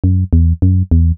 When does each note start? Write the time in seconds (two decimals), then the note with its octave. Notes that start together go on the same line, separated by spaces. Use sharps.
0.04 F#2
0.33 E2
0.62 F#2
0.91 E2